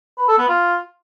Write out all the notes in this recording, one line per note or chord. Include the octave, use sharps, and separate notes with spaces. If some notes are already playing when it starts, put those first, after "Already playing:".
B4
A4
B3
F4